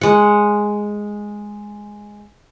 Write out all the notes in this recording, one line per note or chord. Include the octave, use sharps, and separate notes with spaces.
G#3 F#5